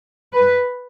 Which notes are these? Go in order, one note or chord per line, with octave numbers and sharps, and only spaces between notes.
B4